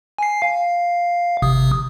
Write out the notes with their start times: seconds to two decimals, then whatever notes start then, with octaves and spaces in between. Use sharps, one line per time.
0.19 G#5 C7
0.42 F5
1.42 G#1 C3 D#6